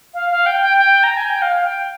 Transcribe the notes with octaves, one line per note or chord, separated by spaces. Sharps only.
F5
F5
G5
G5
G5
A#5
G#5
G5
F5
G5